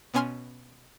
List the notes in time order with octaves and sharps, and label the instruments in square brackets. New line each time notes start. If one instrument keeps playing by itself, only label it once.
[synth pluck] B2 B3 C#4 G#5 C6 F6